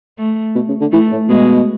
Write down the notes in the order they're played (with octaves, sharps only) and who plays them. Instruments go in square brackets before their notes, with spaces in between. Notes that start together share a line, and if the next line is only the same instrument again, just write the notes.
[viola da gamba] A3
[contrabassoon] B2
C#3
D3
[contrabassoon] E3 [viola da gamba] A3
[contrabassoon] A2
[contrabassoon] B2 [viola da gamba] G#3